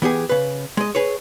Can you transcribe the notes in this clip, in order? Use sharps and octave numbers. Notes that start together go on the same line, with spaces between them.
E3 B3 G4 G#4
C#3 B4
G#3 D#5
G#4 B4 C#5